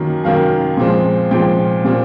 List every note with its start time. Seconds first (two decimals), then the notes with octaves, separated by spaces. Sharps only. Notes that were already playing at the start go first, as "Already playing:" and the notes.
Already playing: F#2 D#3 F#3 A#3
0.24 F#2 D#3 F#3 A#3 F5
0.77 A#2 F3 G#3 C4
1.31 A#2 F3 G#3 C4 G5
1.85 A#2 G3 C4